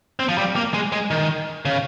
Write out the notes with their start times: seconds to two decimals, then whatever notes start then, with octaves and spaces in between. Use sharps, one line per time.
0.19 C4
0.28 F3
0.38 G3
0.56 A#3
0.74 G#3
0.92 G#3
1.11 D#3
1.65 C#3